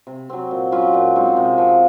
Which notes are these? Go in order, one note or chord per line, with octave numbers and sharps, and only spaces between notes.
C3
F#3 C4
A#2
F#3 C#4 F4
A#2
G#3 C4 D#4
C3
F3 C4